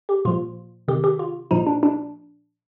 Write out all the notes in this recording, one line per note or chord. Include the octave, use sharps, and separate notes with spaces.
G4
A#2 F3 F4
C3 D#3 G4
G4
F4
A#2 F3 D#4
D4
D4